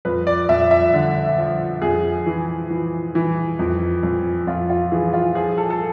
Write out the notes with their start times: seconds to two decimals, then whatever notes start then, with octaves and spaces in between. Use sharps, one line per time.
0.05 F2 B4
0.27 D5
0.49 F2 E5
0.71 E5
0.94 D3
1.38 F3
1.82 F2 G#4
2.26 E3
2.70 E3
3.15 E3
3.59 F2
4.03 F2
4.47 F2 F4
4.70 F4
4.92 E3 G#4
5.13 F4
5.35 F3 G#4
5.58 A4
5.70 A4